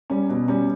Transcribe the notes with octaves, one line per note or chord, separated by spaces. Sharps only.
G3 C#4
B2
G3 C#4